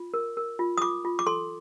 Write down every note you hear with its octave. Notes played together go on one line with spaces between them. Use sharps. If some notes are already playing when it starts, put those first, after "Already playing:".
Already playing: F4
A#4
A#4
F4
D#6
F4 D6
F4
D6
A4 C6